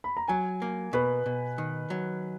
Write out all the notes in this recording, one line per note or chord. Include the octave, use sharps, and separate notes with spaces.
B5
A#5
F#3 G#5
A#3
B2 B4
B2
D#3
F#3